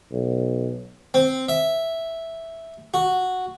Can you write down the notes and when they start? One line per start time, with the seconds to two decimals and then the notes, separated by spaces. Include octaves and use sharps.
0.12 B1
1.14 C4
1.48 E5
2.94 F#4